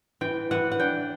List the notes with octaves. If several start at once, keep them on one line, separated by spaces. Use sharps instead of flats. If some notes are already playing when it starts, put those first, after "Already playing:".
E3 G5
E3 F#5
F#5
D4 G5